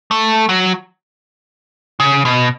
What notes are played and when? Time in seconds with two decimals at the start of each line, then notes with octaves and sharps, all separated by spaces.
0.11 A3
0.49 F#3
2.00 C#3
2.25 B2